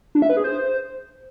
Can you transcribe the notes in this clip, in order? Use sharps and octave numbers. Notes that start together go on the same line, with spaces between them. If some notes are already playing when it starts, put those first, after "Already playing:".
D4
E5
B4
G#4
C5